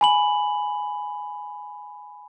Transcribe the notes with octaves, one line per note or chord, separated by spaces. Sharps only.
G#5 B5 F#7